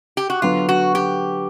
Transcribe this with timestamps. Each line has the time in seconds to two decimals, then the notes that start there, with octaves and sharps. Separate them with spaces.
0.17 G4
0.30 F#4
0.42 D3 F#3 B3 F4
0.69 F#4
0.95 G4